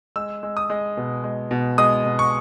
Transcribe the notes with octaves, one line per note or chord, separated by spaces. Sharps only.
G#3 E6
G#3
D#6
G#3
B2
G#3
B2
G#3 D#6
B2
C#6